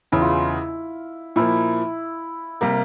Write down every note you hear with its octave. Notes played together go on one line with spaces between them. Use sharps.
E1 E2 C#3 E3 E4
F4
E4
A#2 F3 A#3 E4
C3 G3 A#3